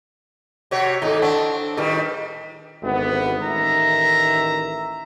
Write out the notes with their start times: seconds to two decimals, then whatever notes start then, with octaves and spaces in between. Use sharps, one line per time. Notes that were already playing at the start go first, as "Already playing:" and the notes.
0.71 C3 F#4 C#5
1.02 D#2 G#2 D#4 E4 A4
1.22 C4 D4 F#5 A5 C#6
1.77 A2 D#3 G3 G#4 B4 D#5
2.83 G#1 D2 B3
3.42 A1 D#3 E5 A#5